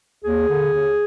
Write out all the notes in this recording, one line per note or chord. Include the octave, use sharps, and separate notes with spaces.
D#2 G#4
D3
D#2